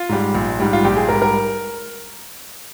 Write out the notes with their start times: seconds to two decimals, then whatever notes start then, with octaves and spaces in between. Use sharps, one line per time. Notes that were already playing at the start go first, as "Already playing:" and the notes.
Already playing: F4
0.09 G#2 G3
0.35 A#1
0.60 G#2 G3
0.73 F4
0.85 A#1 G4
0.96 G#4
1.09 G#2 G3 A#4
1.22 A#4